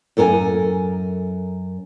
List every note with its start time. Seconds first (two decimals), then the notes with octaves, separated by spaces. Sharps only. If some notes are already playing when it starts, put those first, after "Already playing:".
0.17 F#2 A4 A#4 G#5